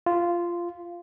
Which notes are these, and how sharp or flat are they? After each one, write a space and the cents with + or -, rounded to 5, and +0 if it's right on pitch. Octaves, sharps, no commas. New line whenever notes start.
F4 -10